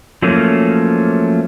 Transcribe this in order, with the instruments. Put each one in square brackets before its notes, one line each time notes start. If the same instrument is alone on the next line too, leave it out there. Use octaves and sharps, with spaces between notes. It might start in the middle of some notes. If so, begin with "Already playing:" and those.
[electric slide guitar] F3 F#3 A3 A#3 C#4